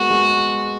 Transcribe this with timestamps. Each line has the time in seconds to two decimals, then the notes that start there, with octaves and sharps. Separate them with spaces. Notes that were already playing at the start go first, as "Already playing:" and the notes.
Already playing: G#3 A#3 B3 F#4
0.10 G#3